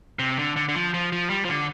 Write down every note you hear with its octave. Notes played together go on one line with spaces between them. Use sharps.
C3
D3
D3
D3
F3
F3
F3
G3
F3
D3